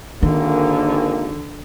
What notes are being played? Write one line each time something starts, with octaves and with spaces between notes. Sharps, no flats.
G#1 D3 D#3 A#3